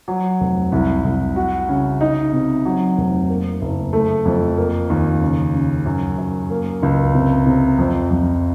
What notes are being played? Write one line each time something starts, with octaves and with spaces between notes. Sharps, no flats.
F#3
F1
C2
C2
F#4
C#3
D#4
C3
F#3
F1
A#3
F#1
A3
F2
A#3
D#2
C#3
C#3
F#2
F#2
A#3
C#2
C3
C3
F2
F2